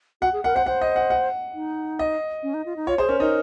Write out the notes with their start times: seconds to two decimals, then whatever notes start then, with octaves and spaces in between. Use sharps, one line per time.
0.22 F#4 F#5
0.33 G#4
0.44 A#4 F#5
0.55 C5 F#5
0.66 C5 F#5
0.81 D#5
0.96 F#5
1.10 F#5
1.54 D#4
1.99 D#5
2.43 C#4
2.54 D#4
2.66 F4
2.76 D#4
2.87 F4 C#5
2.98 G#4 C5
3.09 C#4 A#4
3.20 D#4 A#4